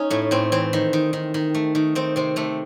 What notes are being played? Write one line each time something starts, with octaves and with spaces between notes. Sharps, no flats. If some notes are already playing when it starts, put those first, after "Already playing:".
Already playing: C#4 D#4
A2 A3
A2 C4
E3 C4
D#3
D#3
D#3
D#3
A3
D#3
D#3 C4
C3 C4
C3 A3